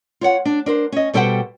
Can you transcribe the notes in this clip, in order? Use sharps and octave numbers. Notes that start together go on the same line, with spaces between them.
F4 C#5 F#5
D4
D4 A#4 C5
C#4 D#5
B2 G3 A4 C5 F#5 G5